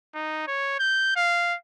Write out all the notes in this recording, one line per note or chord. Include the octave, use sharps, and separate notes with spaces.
D#4
C#5
G6
F5